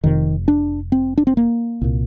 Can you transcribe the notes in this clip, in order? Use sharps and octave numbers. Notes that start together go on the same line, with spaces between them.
F1 F2 C3 D#3
D4
C4
D4
C4
A#3
C2 A#2